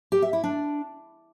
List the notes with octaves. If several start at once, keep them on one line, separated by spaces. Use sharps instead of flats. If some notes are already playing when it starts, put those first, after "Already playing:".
G4
E5
E4
D4